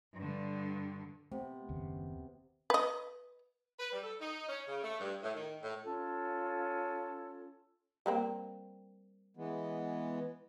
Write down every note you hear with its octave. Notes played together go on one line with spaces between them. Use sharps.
G2 D3
C3 A3 B3
F#1 D#2 C#3
B4 D#5
B4
G3
A4
D#4
C#4
C#3
A3
G2
A2
D#3
A2
C#4 F4 A4
G3 A#3 C4
E3 G#3 B3